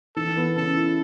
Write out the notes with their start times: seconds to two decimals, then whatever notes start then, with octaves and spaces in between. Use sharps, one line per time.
0.16 E3 A4
0.37 B3
0.57 C#3 A4
0.76 E4